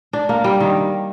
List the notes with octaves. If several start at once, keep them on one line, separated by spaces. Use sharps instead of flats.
D4
A#3
G3
D#3